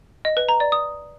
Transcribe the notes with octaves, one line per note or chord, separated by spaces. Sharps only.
D#5
B4
A#5
D5
D#6